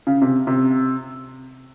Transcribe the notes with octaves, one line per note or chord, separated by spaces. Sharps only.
C#3
C3
C3